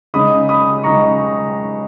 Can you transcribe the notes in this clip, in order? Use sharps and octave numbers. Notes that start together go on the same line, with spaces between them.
C#3 G#3 D#4 B5 D#6
B5 D#6
C#3 G#3 D#4 A#5 C#6